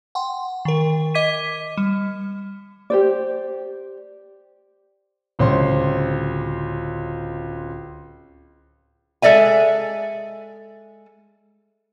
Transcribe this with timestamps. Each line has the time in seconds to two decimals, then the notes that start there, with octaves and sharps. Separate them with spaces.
0.15 F#5 G5 C6
0.65 D#3 A#4
1.14 D#5 D6 G#6 B6 D#7
1.77 G3
2.90 G4 C5 D5
5.39 D1 C#2 C5 C#5 C6
9.22 G#3 A4 D5 E5 G#5